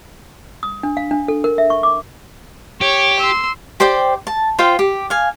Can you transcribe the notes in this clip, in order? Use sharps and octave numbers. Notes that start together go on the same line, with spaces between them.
D#6
D4
F5
D4
A4
A#4
E5
C#6
D6
G4 C#5
C6 E6
G4 C5 D5 G5
A5
F4 C5 F5 G5
G4
F5 G#5